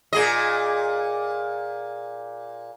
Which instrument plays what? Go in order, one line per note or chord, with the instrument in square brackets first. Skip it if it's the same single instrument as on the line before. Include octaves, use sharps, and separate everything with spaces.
[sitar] A#2 G#4 D#5